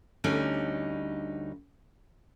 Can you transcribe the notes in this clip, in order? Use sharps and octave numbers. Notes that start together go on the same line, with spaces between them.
D2 D3 G3 C#4 D#4